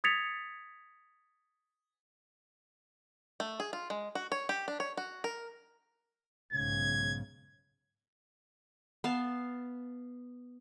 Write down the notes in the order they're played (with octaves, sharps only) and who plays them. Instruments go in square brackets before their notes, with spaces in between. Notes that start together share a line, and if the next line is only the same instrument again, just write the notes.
[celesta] D#6 G#6 A6 B6 C#7 F7
[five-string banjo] A3
G#4
F4
G#3
F#4
C#5
G4
D4
C#5
F#4
A#4
[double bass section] B1 G#2 C#3 [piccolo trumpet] G#6
[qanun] B3 F5 A5